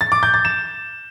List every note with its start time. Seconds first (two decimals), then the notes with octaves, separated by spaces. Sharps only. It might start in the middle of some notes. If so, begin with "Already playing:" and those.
0.01 A6
0.12 D6
0.23 G6
0.34 A6
0.45 E7